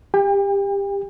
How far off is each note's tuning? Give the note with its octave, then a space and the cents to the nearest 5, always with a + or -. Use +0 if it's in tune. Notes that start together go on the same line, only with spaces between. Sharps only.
G4 +20 G5 +40